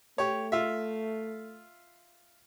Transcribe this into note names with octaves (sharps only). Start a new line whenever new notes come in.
A3 G4 C#5
F4 E5